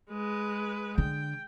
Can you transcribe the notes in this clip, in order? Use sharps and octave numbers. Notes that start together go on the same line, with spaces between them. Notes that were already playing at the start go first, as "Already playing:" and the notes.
G#3 B4
D3 G5